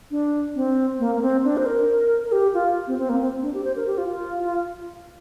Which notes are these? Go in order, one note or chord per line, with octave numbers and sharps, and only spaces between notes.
D4
C4
A#3
A#3
C4
D4
C5
A#4
A#4
G4
F4
C4
C4
A#3
C4
D4
G4
C5
A#4
G4
F4
F4
F4